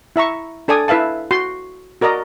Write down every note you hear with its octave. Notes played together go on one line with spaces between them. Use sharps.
E4 E5 A#5 C#6
D4 A4 D5 G#5 D#6
E4 B4 E5 F5 A5
F#4 C6
F#4 A#4 D5 D#5 A#5